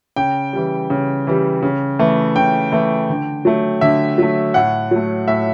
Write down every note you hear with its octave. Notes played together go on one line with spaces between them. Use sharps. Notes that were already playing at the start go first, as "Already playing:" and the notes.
C#3 G5
E3 G3
C#3
E3 G3
C#3
E3 A3
C#3 G5
E3 A3
D3
F#3 A3
D3 E5
F#3 A3
A2 F#5
F#3 A3
A2 E5